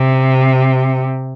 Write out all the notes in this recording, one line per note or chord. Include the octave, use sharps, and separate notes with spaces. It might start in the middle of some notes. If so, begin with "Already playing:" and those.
Already playing: C3